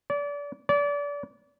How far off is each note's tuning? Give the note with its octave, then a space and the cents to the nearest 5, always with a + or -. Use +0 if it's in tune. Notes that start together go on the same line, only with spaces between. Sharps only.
D5 -30
D5 -30